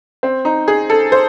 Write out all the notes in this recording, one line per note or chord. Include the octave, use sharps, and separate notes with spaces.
C4
D#4
G#4
A4
C5